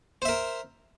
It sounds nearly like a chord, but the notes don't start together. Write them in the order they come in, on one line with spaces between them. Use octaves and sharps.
C5 E5 A#4